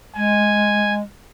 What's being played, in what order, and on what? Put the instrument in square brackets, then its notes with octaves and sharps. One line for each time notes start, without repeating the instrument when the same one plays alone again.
[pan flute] G#3 [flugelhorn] G#5